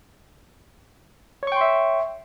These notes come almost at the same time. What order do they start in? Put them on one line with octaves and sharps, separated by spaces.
C#5 C#6 G5 C6 E5